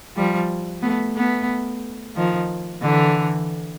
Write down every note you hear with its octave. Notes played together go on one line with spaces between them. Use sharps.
F3 G3
A3 B3
A3 B3
D#3 F3
D3 E3